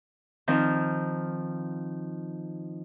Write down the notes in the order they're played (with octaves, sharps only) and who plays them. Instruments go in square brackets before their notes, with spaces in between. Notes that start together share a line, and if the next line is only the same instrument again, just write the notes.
[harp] D#3 F3 C4